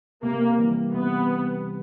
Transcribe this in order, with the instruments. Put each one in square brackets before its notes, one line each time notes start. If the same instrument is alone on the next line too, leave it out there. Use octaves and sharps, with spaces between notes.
[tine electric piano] C3 [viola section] A#3
[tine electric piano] E3 G3
[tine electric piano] C3 [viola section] B3